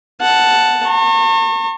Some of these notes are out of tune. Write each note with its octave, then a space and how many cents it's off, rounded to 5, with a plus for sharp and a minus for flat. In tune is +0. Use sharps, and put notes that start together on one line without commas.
F#5 +0 A5 +0
A5 +45 C#6 -35